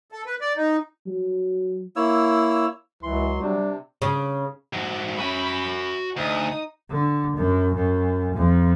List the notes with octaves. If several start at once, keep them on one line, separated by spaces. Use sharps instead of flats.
A4
B4
D5
D#4
F#3
A#3 E4 C#5 E6
C#2 E3 F#3 C6
C3 G3 D4
C#3
G#2 F#3
C#4 F#4 G#5 B5
D2 D#4 D#6
D3
F#2
F#2
F2